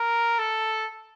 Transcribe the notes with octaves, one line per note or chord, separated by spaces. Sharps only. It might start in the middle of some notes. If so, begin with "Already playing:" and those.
Already playing: A#4
A4